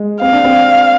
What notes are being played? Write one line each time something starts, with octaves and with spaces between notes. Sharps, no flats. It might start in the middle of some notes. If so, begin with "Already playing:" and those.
Already playing: G#3
C4 F5
D4
C4